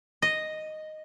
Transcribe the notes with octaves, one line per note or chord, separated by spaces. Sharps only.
D#5